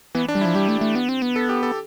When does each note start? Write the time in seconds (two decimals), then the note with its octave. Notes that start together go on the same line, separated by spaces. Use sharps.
0.15 E3 B3
0.28 D4
0.35 G3
0.41 E4
0.45 F3
0.55 G3 G4
0.68 A3
0.81 A3
0.95 B3
1.09 C4
1.22 B3
1.36 A4
1.49 G4
1.63 A4